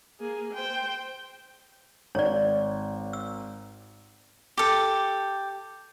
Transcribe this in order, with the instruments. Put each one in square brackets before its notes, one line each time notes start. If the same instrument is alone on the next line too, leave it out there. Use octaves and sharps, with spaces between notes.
[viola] A#3 G#4
C5 G5
[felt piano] G#1 [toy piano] C#5 D5
[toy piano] E6
[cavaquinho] G4 A4